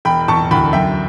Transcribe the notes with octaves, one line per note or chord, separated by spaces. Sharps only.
E1 G5 B5
E1 A5 C#6
D2 G5 B5
F#2 E5 G5